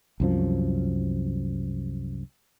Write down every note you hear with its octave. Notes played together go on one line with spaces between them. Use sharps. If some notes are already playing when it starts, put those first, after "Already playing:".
C2 F#2 F3